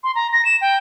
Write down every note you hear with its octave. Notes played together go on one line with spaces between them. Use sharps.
C6
A#5
A#6
E7
G5